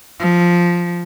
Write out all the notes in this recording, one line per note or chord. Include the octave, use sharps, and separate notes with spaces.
F3